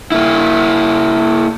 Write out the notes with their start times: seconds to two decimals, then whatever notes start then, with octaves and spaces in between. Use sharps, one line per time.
0.12 A#3 E4